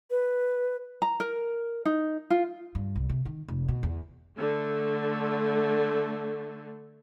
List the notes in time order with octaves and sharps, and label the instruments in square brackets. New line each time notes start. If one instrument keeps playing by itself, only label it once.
[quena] B4
[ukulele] A#5
A#4
D#4
F4
[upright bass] G2
C2
C3
D#3
F1
B2
E2
[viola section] D3 A3